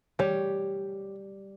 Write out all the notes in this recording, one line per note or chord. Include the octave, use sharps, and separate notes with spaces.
G3 G4 C#5